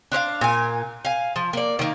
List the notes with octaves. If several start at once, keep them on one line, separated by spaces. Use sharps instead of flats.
D4 C5 C#5 F5
A#2 G#5
F5 G#5
F3
A#3 D5
D#3 A#3